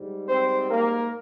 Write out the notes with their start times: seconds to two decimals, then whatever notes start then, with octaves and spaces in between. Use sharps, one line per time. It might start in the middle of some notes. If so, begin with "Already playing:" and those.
Already playing: G#2 G3
0.28 C4 C5
0.70 A#3 A#4